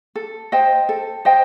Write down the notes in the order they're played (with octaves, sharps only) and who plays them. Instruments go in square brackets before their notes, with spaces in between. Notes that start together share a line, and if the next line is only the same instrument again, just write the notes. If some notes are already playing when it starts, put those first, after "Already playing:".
[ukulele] A4
C5 D#5 G5
A4
C5 D#5 G5